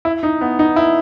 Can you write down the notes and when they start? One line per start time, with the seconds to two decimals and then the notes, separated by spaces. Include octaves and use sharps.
0.05 E4
0.23 D#4
0.41 B3
0.59 D#4
0.76 E4